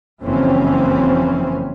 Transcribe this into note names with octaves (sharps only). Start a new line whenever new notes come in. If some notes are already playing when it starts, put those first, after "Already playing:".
F#1 F2 E3 C4 C#4